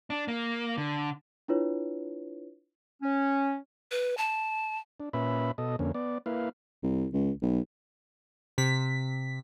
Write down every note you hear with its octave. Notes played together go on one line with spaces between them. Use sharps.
D4
A#3
D3
D4 E4 F4 B4 C#5
C#4
B4
A5
D4
A#2 C#4 B4 E5 B5
B2 A4 D#5
F2 D3 A#3 C#4
B3 D5
A#3 E4 B4 F5
C2
C#2
B1
C3 B6